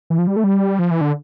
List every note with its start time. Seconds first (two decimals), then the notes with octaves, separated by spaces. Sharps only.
0.10 E3
0.18 F3
0.27 G3
0.36 A3
0.44 G3
0.79 F3
0.91 E3
1.01 D3